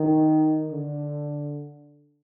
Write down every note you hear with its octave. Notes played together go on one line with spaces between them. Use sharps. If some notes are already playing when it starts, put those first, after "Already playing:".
Already playing: D#3
D3